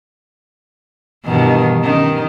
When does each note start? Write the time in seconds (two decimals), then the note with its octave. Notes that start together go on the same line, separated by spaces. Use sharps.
1.25 G2 B2 D#3 E3
1.83 D#3 C#4